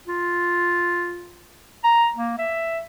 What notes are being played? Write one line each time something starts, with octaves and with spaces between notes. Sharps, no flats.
F4
A#5
A#3
E5